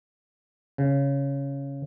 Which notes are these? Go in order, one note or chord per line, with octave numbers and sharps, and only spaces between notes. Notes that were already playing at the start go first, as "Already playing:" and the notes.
C#3